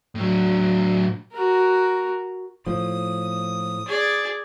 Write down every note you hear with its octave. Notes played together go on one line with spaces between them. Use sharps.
A2 F#3
F#4 A#4
A2 F3 D#6
G#4 D5